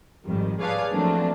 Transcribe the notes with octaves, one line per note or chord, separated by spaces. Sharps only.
G#1 F2 D#3 G3
G#4 B4 C#5 D5 F5 A5
F3 F#3 A3 A#3 C4 D4